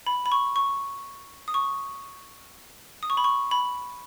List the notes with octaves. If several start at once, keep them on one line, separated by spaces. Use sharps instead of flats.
B5
B5
C#6
C#6
D#6
C#6
D#6
C#6
B5
C#6
B5